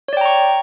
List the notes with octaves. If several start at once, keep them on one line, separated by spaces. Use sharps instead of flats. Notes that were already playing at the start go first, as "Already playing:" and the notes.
C#5 D5 G5 A#5 C#6